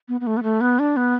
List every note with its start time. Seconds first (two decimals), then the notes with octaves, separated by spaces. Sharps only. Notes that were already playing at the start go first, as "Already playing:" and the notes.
0.08 B3
0.21 B3
0.27 A3
0.37 B3
0.43 A3
0.61 B3
0.79 D4
0.97 B3